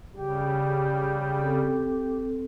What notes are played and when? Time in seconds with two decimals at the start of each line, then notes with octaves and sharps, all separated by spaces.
0.15 C#3 G3 G4
1.41 C4 A4